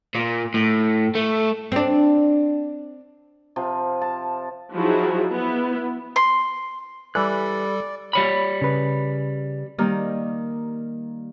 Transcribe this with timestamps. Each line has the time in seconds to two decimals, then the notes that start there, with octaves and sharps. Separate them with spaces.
0.15 A#2
0.54 A2
1.15 A3
1.72 C4 D4
3.56 C3 F3
4.02 A5
4.74 F3 F#3 D#4 E4 F#4 G#4
5.33 B3 E4
6.16 C6
7.15 E3 G3 G4 A4 D5 B5 F#6
8.13 G3 C#5 B5
8.61 C#3 B4
9.78 D#3 G3 A#3 G4 A#4